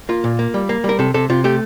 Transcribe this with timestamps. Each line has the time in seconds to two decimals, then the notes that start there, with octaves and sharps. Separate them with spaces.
0.09 A#3 F4
0.24 A#2
0.39 A#3
0.54 G3
0.69 A#3
0.84 G3
0.89 A#4
0.99 C3 A4
1.14 C3 A4
1.30 C3 F4
1.44 A3 G4